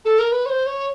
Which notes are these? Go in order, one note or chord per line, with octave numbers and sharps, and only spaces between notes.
A4
A#4
B4
C#5
C5
C#5